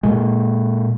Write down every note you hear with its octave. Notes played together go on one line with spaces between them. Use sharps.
A#2 G#3